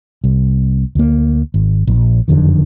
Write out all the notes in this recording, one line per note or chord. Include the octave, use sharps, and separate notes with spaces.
C2
D2 A#3
G#1
A#1
F#1 F2 D3 D#3